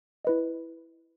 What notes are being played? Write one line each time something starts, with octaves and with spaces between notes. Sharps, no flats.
E4 B4 D#5